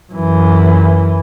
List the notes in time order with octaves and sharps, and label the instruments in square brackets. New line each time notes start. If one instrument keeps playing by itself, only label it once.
[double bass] F#2 E3